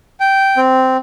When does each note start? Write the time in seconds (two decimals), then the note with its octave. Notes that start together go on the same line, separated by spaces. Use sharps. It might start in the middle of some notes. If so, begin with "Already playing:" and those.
0.20 G5
0.57 C4